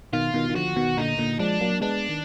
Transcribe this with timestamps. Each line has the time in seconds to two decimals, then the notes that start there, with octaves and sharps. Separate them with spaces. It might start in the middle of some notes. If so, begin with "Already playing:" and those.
0.13 B2 D#3 F4
0.34 B2 D#3
0.50 D#3
0.55 D3 F3 F#4
0.76 B2 D#3
0.97 A#2 D3 D#4
1.18 A#2 D3
1.39 F3 G#3 D4
1.61 F#3 A#3
1.81 G#3 B3 D4
2.09 D#3